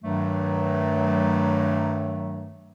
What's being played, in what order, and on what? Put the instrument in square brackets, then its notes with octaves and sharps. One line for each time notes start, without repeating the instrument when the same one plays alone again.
[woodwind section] G2 D#3 F#3 A3